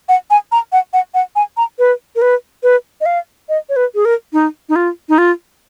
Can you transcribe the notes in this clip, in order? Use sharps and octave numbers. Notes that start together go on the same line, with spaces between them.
F#5
G#5
A#5
F#5
F#5
F#5
G#5
A#5
B4
A#4
B4
B4
D#5
F5
D#5
C#5
B4
G#4
A#4
D#4
D#4
F4
D#4
F4